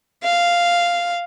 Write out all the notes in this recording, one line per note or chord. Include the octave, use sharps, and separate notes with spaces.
F5